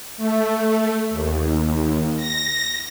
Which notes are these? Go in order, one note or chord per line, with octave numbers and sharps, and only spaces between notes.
A3
D#2
A#6